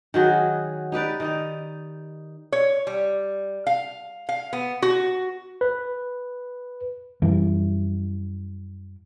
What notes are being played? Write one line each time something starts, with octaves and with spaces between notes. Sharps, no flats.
D#3 F#3 F#4 G#4
D#4 G4 B4 D5
D#3 D#4 D5
C#5
G3
F5
F5
B3
F#4
B4
F#2 E3 G3